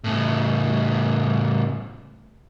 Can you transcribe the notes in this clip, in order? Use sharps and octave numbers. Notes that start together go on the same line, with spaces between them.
A2 C#3